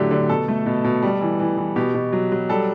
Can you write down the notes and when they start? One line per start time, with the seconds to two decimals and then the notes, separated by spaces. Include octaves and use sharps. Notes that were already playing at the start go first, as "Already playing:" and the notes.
Already playing: A2 D3 F#3 A3 G4
0.11 D3
0.29 B2 A4
0.48 A3
0.66 B2
0.84 B2
1.02 G3
1.21 E3
1.39 E3
1.58 E3
1.76 B2 G4
1.95 B2
2.13 F#3
2.32 F#3
2.49 G3 A4